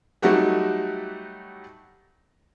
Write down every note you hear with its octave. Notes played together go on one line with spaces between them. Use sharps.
F#3 G3 A3 D#4 F#4 G4